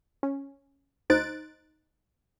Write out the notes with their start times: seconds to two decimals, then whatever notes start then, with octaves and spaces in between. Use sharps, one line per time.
0.23 C#4
1.10 D2 D#4 C5 F#6 A6 D7